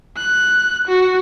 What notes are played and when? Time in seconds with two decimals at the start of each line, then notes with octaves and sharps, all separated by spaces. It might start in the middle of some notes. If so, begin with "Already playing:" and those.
0.17 F#6
0.88 F#4